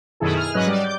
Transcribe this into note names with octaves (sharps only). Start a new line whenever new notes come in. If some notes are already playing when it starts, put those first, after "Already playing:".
F#2 B2 D#3 E4 G#4 A4
G#4 F6
G#2 F#3 C#4 B4 D#5 F#6
G3 D5
D6 G6